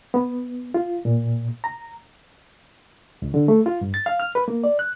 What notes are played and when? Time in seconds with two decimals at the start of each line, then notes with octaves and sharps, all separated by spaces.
0.14 B3
0.74 F4
1.05 A#2
1.64 A#5
3.22 C#2
3.34 D3
3.48 A3
3.66 F4
3.81 G2
3.94 A6
4.06 F5
4.20 F6
4.35 B4
4.48 A#3
4.64 D5
4.79 F#6